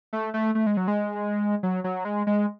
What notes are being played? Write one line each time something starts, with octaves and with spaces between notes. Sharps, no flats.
A3
A3
A3
G#3
F#3
G#3
F#3
F#3
G#3
G#3